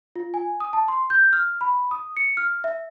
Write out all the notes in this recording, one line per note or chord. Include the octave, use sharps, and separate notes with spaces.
F4
G#5
D#6
A5
C6
G6
F6
B5
D#6
C#7
F6
E5